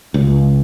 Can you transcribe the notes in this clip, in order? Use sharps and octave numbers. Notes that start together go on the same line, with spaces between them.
C#2